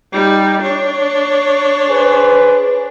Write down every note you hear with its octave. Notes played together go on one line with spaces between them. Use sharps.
G3 D#4
D4 C#5
G#4 B4 C5